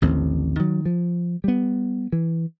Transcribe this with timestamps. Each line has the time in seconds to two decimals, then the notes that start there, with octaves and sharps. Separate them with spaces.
0.02 A1 D#2 D3 C4
0.59 D#3 F#3
0.86 F3
1.44 G3 B3
2.12 E3